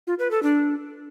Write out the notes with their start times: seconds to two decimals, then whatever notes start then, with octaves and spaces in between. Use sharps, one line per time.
0.07 F4
0.19 B4
0.31 A4
0.43 D4